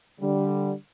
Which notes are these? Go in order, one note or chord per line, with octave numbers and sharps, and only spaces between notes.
D3 G3